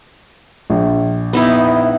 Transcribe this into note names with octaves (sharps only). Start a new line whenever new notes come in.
A#1
B3 D#4 E4